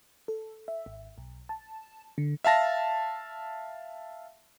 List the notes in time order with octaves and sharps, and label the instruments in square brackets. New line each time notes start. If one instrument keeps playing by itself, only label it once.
[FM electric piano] A4
E5
G#1
B1
A5
D3
[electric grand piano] E5 F5 A5 A#6